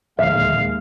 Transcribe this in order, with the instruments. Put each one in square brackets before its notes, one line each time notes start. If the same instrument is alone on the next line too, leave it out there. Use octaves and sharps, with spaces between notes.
[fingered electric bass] D1 A#1 [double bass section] D#2 G#3 [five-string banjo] E5 [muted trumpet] F5